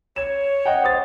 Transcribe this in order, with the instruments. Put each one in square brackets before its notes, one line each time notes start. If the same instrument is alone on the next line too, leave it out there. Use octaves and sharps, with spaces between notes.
[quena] C#5 [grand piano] G#6 E7
[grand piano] D#5 F#5 G5
C5 D#6 A6